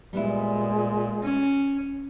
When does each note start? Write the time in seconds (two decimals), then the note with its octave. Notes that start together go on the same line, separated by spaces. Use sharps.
0.13 A#2 G3 G#3 B3 E4
1.22 C#4